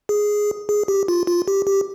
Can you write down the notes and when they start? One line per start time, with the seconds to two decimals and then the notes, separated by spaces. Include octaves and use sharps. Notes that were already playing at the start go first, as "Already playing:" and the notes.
0.09 G#4
0.69 G#4
0.88 G4
1.08 F4
1.27 F4
1.48 G4
1.67 G4